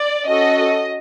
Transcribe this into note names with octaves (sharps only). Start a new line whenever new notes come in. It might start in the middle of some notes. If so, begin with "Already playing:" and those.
Already playing: D5
C#4 F#4 A4 D#5